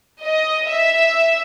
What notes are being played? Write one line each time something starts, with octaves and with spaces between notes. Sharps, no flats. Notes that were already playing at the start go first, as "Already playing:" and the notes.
D#5
E5